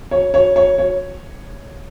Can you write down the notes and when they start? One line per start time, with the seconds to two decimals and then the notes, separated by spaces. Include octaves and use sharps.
0.11 C#5
0.34 C#5
0.56 C#5
0.78 C#5